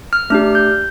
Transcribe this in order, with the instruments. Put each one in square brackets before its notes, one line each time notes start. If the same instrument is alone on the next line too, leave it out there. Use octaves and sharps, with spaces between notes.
[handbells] F6
A3 D4 G4 F6
G6